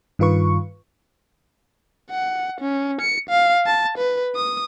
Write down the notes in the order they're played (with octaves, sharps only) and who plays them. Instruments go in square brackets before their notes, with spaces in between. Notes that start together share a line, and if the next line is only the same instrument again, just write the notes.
[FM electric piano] G2 D#3 F4 B4 C#6
[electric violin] F#5
C#4
C#7
F5
A5
B4
D#6